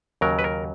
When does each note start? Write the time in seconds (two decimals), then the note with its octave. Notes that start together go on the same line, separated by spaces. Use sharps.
0.21 D#2 C#3 F#3 A#4
0.39 B4
0.44 A#4